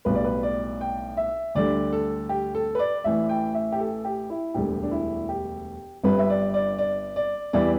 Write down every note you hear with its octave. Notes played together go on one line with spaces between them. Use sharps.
B1 A2 G3 B4
D5
B4
D5
G5
E5
D2 D3 G3 D5
A4
G4
A4
B4
D5
A1 A2 E3 E5
G5
E5
G4
A4
G4
E4
E1 D2 D3 G3 G4
D4
E4
G4
G1 G2 G3 B4
E5
D5
D5
D5
D5
E2 E3 G3 D5